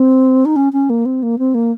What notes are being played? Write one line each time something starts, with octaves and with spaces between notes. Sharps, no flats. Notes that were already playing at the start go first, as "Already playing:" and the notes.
Already playing: C4
D#4
C#4
C#4
A#3
C4
A#3
C4
A#3